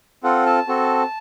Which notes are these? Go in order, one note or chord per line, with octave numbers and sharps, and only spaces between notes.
C4 F4 A4 F#5
A5
C4 F#4 A4